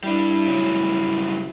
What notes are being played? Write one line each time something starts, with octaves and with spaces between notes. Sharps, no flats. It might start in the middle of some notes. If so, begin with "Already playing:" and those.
G3 D4 E4
C#3 F#3 G3